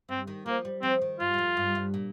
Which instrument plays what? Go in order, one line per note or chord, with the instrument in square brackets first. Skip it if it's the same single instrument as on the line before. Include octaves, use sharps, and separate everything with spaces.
[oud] G2 [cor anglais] C4
[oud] D#3
[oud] F3 [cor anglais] A#3
[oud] G3
[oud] F3 [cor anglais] C4
[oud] D#3
[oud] G2 [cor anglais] F4
[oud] G2
F2
G2
G2
A#2